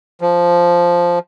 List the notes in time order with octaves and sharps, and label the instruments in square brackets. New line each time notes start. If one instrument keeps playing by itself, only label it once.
[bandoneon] F3